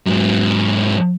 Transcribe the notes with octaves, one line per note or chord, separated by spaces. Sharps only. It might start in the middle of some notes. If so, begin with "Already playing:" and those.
G#2 F#3